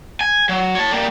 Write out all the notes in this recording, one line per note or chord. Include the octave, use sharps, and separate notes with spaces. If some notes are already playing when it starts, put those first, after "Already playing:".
G#5
F#3
C#5 A5
G3 A#3